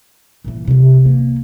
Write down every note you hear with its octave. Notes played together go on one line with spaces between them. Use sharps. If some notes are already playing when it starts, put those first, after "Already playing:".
A#2 E3
C3 E3
A#3